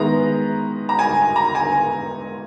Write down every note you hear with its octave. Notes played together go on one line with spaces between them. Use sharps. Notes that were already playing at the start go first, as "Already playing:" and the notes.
Already playing: D#3 G#3 B3 E4 A#5
A#5
G#5
A#5
G#5